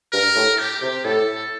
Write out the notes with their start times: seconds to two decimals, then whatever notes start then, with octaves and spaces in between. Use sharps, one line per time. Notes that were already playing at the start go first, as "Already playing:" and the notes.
0.12 G2 A#4
0.36 A2
0.59 G4
0.82 C3
1.05 A2 A4